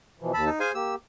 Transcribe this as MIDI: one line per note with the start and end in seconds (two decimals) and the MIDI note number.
0.21 0.32 47
0.21 0.32 52
0.21 0.32 53
0.34 0.50 39
0.34 0.50 81
0.34 0.45 83
0.34 0.50 88
0.46 0.59 63
0.60 0.72 68
0.60 0.72 72
0.60 0.71 77
0.60 0.72 80
0.75 0.96 58
0.75 0.96 67
0.75 0.94 88